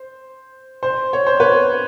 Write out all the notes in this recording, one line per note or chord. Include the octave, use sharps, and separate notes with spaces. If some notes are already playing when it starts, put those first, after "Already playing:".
Already playing: C5
C5
C#5
C5
B4 C#5